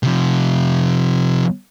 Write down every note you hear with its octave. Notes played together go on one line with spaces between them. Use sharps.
C3 F3